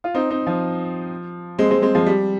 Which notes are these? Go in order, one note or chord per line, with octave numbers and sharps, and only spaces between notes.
F4
C4 D#4
C4 D#4
F3
G#3 C4
G#3 C4
G#3 C4
F3 G#3
G3